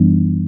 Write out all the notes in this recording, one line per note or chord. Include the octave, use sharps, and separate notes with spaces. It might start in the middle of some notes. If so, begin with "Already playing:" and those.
Already playing: F#2 E3 G3 B3 D4